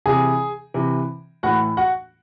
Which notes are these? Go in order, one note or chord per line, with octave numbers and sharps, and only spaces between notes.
C3 E3 G#4 G#5
C3 E3
A2 E3 F#4 F#5
F#4 F#5